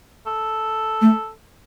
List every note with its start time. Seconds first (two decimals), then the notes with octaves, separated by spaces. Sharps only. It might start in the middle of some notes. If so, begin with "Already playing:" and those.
0.26 A4
1.01 A3